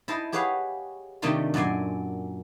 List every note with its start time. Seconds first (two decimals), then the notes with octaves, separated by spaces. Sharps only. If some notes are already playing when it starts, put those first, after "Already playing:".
0.08 E4 C5 D#5 A5
0.32 G4 G#4 B4 C#5 F5 F#5
1.22 C3 D#3 A3 D4 D#4 F4
1.54 F#2 A#2 D5 G#5 C6